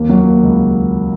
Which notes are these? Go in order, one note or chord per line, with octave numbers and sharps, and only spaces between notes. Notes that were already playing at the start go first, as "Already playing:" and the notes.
Already playing: D#2 A#3
F#3
A#3
C#2